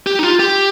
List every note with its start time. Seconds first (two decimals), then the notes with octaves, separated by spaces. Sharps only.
0.07 G4
0.19 D#4
0.23 F4
0.39 G4